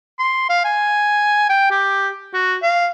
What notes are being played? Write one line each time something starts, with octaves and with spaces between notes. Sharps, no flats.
C6
F5
G#5
G5
G4
F#4
F5